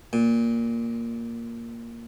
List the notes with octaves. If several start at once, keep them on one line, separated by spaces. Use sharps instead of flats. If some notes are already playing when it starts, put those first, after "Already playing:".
A#2